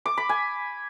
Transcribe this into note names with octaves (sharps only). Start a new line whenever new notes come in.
D6
B5
G#5